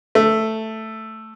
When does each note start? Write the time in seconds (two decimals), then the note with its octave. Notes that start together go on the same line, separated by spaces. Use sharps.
0.15 A3